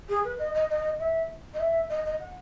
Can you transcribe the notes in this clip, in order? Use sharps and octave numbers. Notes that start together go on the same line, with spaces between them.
G#4
B4
D#5
D#5
D#5
E5
D#5
E5
D#5
D#5
F#5